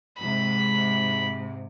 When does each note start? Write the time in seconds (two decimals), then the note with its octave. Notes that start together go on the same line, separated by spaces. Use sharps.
0.18 G#2 C3 B5